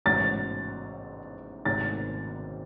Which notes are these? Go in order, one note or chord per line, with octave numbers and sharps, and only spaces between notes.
A1 G#2 F#3 A3 A6
G#1 G#2 D#3 A3 A6